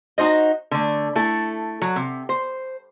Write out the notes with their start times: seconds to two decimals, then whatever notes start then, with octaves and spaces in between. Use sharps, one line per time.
0.18 D#4 F#4 C5 D#5
0.71 D3 A3
1.16 A3 E4 A4
1.82 F#3
1.96 C3
2.29 C5